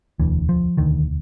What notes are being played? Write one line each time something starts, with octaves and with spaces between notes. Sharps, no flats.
E1 D2 D3 E3
F3
E1 D2 D3 D#3